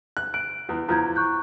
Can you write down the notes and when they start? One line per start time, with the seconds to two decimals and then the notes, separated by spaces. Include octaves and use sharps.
0.17 F#6
0.34 F#6 D7
0.69 E2
0.89 E2 F3 A#5 G6 G#6
1.16 C#6 F#6 G6